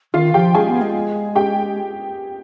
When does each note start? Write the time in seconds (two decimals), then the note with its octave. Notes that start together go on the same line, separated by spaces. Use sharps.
0.14 D#3 F4 F5
0.34 F3 G4 G5
0.54 G#3 G#4 G#5
0.68 B3
0.81 G#3
1.35 G4 G5